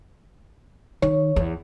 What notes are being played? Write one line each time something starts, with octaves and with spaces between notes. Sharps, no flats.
D#3 C#5
E2